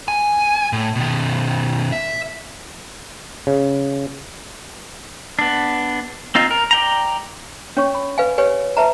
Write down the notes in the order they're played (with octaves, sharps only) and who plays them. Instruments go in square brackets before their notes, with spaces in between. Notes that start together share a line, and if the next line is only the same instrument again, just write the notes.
[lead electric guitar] G#5
A2
B2 D#3
E5
[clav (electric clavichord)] C#3
[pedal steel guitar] B3 D4
C4 D#4 F4
A#4
D5 G5 A#5
[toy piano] C#4 C#5 C#6
B5
B4 F5 G#5
G4 B4 C#5 G#5
B4 E5 A5 A#5